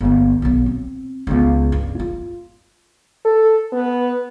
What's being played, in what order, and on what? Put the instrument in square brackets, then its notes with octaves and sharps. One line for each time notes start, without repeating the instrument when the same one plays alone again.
[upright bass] G1 A#3
B1 F#3
C4
C#2 B3
G2
F4
[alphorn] A4
B3